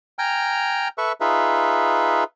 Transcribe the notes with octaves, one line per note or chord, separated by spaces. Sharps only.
G5 G#5 A#5 F6
A4 B4 E5 C#6
D#4 F4 G#4 B4 E5